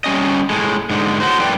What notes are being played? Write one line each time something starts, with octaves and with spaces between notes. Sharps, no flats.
G3 C#4 D#5
A2 G#3
G#2 D3 G#3
A2 F#4 C5
F#2 A2 B4 D5 G5